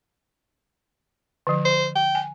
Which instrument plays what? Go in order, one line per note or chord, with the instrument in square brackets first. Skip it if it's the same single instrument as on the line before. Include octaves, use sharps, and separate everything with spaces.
[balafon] D3 F3
[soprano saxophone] C5
G5
[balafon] G#5